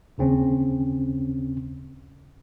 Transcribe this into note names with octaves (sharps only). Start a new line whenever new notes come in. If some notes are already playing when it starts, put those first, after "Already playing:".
D#2 C#3 C4 C#4